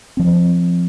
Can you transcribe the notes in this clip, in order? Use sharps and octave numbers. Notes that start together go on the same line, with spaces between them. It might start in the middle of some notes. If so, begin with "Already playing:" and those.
F3 C4